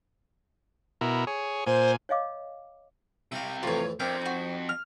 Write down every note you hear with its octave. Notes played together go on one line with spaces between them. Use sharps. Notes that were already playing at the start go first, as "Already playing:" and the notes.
B2 E4 A#4
G#4 C#5
A#2 C5 G#5
C#5 D#5 F5 D6
C3 G3 E5 F5
F2 A2 E3 F4 C#5
F2 C4 D4 A#4 E5 G5
D#4 F#4
F6